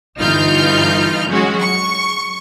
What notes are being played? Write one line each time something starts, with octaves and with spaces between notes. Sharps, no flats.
G1 E3 D#4 F4 F6 G6
F#3 G#3 C#4 F#4
C#6